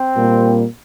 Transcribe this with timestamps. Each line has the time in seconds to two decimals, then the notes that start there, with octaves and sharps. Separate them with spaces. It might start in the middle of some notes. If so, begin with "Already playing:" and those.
Already playing: C4
0.15 A#2 G3 A#3